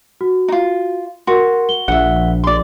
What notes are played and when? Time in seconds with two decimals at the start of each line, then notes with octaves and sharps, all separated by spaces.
0.21 F#4
0.48 D#4 F4
1.27 F#4 A#4 C6
1.69 G7
1.88 A#1 E5 F#5
2.44 D5 C6